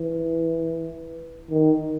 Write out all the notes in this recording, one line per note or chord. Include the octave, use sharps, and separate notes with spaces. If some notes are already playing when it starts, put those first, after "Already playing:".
Already playing: E3
D#3